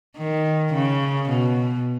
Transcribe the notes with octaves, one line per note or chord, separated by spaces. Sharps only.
D#3
C#3
B2